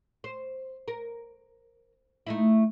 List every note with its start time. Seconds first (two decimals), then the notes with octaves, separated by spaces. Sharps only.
0.24 C5
0.88 A#4
2.27 A3 D#4 E4